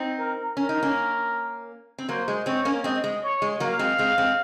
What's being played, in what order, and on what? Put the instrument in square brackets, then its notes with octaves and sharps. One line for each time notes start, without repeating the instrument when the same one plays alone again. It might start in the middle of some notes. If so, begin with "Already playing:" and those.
Already playing: [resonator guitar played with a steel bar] C4 D#4
[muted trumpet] A#4
[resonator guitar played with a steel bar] C#4 [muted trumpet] A#4
[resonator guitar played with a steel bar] D#4
A#3 C#4
C4
[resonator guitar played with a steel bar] F#3 A#3 [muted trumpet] C5
[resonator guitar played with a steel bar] G#3
[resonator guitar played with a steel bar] G#3 C4 [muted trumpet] C#5
[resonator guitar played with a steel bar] A#3 C#4
[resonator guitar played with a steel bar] G#3 C4 [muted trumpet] D#5
[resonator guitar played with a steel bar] G#3
[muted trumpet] C#5
[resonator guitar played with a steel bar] G#3
[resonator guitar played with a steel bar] F#3 A#3 [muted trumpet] F5
[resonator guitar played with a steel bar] G#3 C4
G#3 C4
G#3 C4